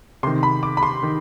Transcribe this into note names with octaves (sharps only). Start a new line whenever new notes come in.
C3 D#3 C6
B5
D6
B5
C6
D#3